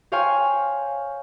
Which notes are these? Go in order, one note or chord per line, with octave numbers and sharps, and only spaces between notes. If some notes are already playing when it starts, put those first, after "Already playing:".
C5 C#5 F5 G5 G#5 C#6